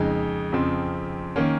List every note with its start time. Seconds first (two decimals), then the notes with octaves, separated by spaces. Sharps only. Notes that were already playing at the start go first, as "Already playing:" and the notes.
Already playing: F2 C#3 G#3 D#4
0.52 F2 C#3 F3 C4
1.36 D#3 A#3 C#4